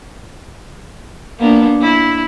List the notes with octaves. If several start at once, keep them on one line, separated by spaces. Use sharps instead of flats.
A#3 B3 D4
E4